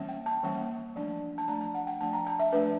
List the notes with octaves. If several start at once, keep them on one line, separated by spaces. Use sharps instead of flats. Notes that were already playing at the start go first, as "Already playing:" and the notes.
Already playing: E3 G3 A#3 C#4
G5
A5
E3 G3 A#3 C#4
F3 A3 D4
A5
F3 A3 D4 A#5
A5
F#5
G5
F3 A3 D4 A5
A#5
A5
E5
F3 A3 D4 B4